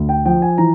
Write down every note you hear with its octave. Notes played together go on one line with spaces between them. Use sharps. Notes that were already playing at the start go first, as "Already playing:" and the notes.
Already playing: D2
G5
F3 G5
G#5
E3 A#5